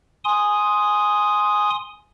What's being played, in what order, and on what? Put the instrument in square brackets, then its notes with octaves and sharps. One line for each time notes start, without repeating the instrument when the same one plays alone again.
[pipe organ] G#5 C6 D#6